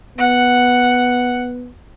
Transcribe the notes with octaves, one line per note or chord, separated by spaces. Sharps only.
B3 F#5